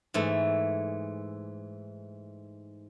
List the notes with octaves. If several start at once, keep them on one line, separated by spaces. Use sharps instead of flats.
G#2 E3 A3